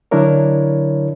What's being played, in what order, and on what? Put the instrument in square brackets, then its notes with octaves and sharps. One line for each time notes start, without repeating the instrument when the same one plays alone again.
[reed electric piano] D3 F#3 D4 E4 A#4 C#5